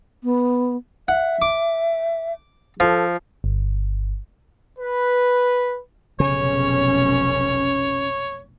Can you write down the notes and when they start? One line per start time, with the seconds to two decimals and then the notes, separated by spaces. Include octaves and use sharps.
0.24 B3
1.08 E5 F#5
1.42 D6
2.80 F3 A4
3.44 G1
4.79 B4
6.20 F1 B1 C#3 C#4 C#5